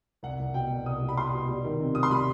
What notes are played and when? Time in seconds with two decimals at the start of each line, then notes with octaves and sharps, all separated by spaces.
0.23 C2 F#5
0.39 C2
0.54 B2 G5
0.70 C2
0.85 C2 D#6
1.02 G3
1.09 B5
1.17 G3 C6
1.33 B2
1.49 G3
1.64 D#3
1.80 C3
1.95 C3 D#6
2.03 C6
2.11 G3 B5